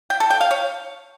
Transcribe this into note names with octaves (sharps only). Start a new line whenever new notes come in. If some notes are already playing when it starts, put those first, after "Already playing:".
G5
A4
G5
F5
C#5